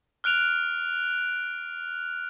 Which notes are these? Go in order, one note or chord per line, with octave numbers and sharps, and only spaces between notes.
F6 F#6 D7 F7